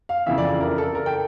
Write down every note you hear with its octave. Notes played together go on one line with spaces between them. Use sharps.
F5
F2 C#3 E3 E5
D5
A#4
A4
A#4
G5